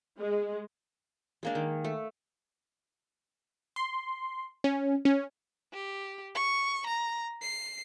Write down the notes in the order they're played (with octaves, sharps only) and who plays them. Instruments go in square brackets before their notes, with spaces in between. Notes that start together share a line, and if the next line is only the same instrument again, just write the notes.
[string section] G#3
[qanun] G#3 A#3 D4
D#3
A3
[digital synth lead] C6
C#4
C#4
[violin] G4
C#6
A#5
C7